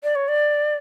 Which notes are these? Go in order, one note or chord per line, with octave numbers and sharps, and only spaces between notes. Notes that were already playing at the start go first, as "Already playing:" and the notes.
D5
C#5
D5